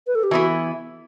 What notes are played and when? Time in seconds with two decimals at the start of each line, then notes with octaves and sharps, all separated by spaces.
0.07 B4
0.15 A4
0.23 G4
0.31 E3 B3 E4 F#4